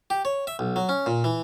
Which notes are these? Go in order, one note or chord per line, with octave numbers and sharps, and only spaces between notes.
G4
C#5
E5
B1
F#3
C#4
A#2
E3